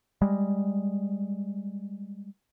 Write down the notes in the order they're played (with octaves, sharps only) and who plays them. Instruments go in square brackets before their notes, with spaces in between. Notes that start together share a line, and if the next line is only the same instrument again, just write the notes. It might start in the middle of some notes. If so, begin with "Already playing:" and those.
[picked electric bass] G3 G#3